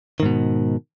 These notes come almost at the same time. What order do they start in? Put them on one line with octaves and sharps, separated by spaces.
D#3 G#2 B2